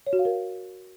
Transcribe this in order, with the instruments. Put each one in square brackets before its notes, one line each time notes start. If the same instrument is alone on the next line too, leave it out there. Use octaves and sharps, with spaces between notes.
[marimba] C#5
F#4
F5
A#4